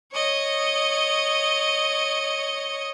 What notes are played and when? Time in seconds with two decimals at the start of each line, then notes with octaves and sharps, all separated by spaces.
0.13 C#5 D#5